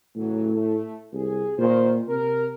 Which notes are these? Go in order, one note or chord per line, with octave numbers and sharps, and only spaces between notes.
A2 C#3 E3 F#3
A3
C2 G#4
A#2 D#3 C5
C3 A#4